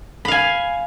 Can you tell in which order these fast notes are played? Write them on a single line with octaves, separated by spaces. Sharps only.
B5 F5 G#5